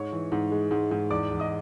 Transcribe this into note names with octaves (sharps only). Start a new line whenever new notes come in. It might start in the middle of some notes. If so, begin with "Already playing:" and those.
Already playing: G#2 C#5 C#6
E3
G#2
G#3
G#2
G#2
E2 D5 D6
E2
D#5 D#6